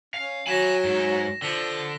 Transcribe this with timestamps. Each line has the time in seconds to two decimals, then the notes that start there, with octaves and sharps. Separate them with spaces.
0.14 C#4 F5
0.47 F#3 G#5 B5 A#6 B6 E7
0.84 G#2
1.42 D3 F3 A#6 B6 G7